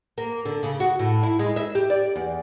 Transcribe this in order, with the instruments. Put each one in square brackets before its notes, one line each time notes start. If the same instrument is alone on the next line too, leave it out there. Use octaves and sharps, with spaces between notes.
[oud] A#3
D3
C#3
F#4
A2
E4
G#3
E5
G4
D5
E2